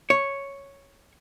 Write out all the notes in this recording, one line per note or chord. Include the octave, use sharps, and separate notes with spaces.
C#5